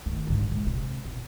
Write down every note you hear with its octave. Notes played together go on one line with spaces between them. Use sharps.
D#3 A3
G#1 D3
A#1 G#3
C3
B2